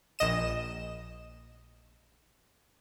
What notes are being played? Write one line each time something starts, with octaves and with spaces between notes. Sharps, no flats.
A#1 D#5 E7